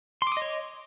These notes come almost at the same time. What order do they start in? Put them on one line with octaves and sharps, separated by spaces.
C6 D6 D#6 D#5 C#5